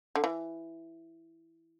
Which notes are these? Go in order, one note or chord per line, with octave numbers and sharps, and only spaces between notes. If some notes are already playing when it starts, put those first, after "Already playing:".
D3
E3